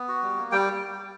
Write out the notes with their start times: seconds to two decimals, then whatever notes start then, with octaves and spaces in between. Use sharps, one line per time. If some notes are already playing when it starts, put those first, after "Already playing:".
Already playing: B3
0.08 F#4
0.22 G3
0.37 A#3
0.52 G3 G5